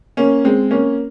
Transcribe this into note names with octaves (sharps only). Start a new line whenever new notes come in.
A#3 C#4
G#3 C4
A#3 C#4